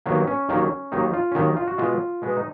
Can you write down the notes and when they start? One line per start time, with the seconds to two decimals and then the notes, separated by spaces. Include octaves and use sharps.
0.06 D#2 D#3 F#3 A#3 B3
0.27 C#4
0.49 D#2 D#3 F#3 A#3
0.92 D#2 D#3 F#3 A#3 D#4
1.13 F4
1.32 C#4
1.35 D#2 D#3 F#3 A#3 D#4
1.57 F4
1.67 F#4
1.78 B2 G#3 B3 F4
2.22 B2 G#3 B3
2.37 D#4